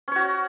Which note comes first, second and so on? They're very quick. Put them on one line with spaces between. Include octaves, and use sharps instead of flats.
C#4 C#5 F#4